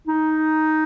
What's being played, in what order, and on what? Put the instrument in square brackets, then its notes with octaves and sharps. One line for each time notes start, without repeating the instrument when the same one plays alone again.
[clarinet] D#4